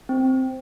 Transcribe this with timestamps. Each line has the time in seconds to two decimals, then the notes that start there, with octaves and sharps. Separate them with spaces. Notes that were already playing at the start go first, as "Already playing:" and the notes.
0.09 C4